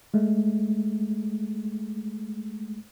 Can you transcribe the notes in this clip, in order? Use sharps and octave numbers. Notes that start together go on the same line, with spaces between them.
G#3 A3